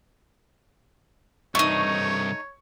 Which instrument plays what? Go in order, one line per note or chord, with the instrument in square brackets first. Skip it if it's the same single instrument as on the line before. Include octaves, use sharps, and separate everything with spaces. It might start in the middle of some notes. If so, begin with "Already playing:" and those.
[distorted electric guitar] C2 G2 [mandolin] A3 D#4 [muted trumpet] C#5 [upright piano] C#6